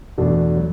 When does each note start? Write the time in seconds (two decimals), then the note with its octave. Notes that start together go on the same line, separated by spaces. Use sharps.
0.18 E2 B2 A3 D4 F#4
0.57 F#3